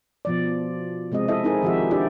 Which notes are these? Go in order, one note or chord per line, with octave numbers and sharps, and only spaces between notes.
B2 F3 D5
C3 G#3 C4 D#5
E4 A4 D#5 E5
C4 D#4 E4 G#4 A#4
D#3 F3 F#4 G4 E5
D4 E4 G4 D5